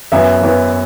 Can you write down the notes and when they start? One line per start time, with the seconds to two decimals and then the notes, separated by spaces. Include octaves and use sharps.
0.12 F#2 E3 B3 E5
0.41 F#2 E3 B3